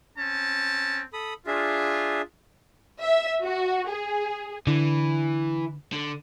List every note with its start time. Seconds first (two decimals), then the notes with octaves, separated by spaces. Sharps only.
0.17 C4 C#4 A5
1.13 A4 B5 D#6
1.47 D4 F4 G#4 E5
3.02 E5
3.44 F#4
3.89 G#4
4.67 D3 E3
5.93 D3